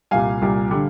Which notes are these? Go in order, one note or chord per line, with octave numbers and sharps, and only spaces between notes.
C2 A#2 G3 F5 G#5
C2 A#2 G3
D3 G3